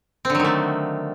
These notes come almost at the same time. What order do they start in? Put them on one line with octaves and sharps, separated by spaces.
C4 D3 F#3 D#3 A3